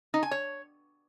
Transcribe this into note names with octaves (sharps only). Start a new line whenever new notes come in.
D#4
G#5
C#5